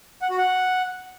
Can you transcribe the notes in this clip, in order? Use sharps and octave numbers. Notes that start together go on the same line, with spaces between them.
F#5
F#4
F#5